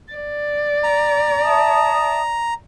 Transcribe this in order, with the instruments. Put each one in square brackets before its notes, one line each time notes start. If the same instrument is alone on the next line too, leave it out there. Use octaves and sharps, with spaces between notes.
[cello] D5
[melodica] A#5
[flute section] E5 A5 D#6